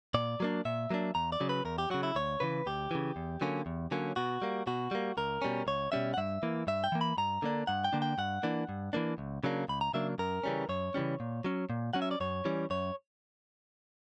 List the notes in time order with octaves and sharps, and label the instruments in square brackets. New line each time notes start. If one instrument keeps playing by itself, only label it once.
[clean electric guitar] A#2 D5
F#3 A#3 D4
A#2 E5
F#3 A#3 D4
E2 A#5
D5
C#3 F#3
B4
E2 A#4
G4
C#3 F#3 F#4
E4
D2 C#5
C#3 E3 B4
D2 G4
C#3 E3
E2
D3 F#3 A#3 C#4
E2
D3 F#3 A#3 C#4
B2 F#4
G3 A#3
B2 F#4
G3 A#3
C#2 A#4
B2 G3 C#4
C#2 C#5
B2 G3 C#4 E5
F#5
G2 E5
E3 A#3
G2 E5
G5
E3 A#3
B5
G2 A#5
D3 A#3 D4
G2 F#5
G5
D3 A#3 D4
G5
G2 F#5
E3 A#3 D4
G2
E3 A#3 D4
C#2
C#3 F#3 A#3 D4
C#2 B5
A#5
C#3 F#3 A#3 D4 E5
F#2 A#4
C#3 E3 G3 C#4
F#2 C#5
C#3 E3 G3 C#4
A#2
F#3 C#4
A#2
F#3 C#4 F#5
E5
D5
F#2 C#5
E3 G3 C#4
F#2 C#5